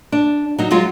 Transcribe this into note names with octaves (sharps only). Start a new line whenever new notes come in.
D4
F#3 D#4
F#3 G#3 F4